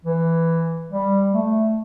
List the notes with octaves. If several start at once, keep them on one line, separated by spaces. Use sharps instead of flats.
E3
G3
A3